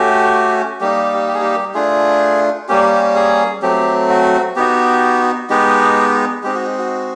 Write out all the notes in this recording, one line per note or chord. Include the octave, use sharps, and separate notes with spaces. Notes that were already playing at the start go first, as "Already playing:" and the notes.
Already playing: A3 C#4 F#4 G4
G3 A#3 D#4 G4
G4
G#4
G4
A3 D4 F4 G#4
G3 A#3 C#4 G4
G#4
F#3 A3 C4 G4
F#4
B3 D#4 F#4 G4
G#3 B3 D#4 G4
G#3 C4 D#4 G4
F#4
F#4